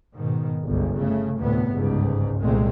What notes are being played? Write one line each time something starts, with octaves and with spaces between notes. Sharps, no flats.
G#2 B2 D#3
G1 C#2
C#3 A3
D2 A2 C3 B3
G1 C#2 G#2
C2 A#2 D#3 G#3 A3 C4